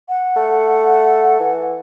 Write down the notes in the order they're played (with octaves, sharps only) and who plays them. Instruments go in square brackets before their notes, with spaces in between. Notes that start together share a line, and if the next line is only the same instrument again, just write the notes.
[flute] F#5
[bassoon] A3
E3